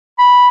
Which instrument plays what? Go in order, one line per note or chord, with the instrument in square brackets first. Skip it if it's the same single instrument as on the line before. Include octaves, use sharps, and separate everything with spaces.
[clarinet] B5